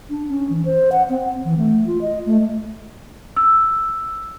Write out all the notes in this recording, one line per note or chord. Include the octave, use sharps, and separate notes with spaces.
D4
C#4
E3
C5
F#5
C4
E3
A3
F4
D#5
A3
E6